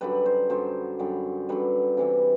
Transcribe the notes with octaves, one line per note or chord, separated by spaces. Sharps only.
F#2 D3 G3 B4
C5
F#2 D3 G3 C5
F#2 D3 G3
F#2 D3 G3 B4
C3 E3 G3